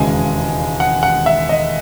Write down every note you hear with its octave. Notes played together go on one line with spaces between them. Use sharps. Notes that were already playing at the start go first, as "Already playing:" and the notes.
Already playing: E1 D#2 C#3 E3 G#3 G#5
F#5
F#5
E5
D#5